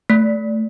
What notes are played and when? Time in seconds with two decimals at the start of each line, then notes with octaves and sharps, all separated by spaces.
0.10 A3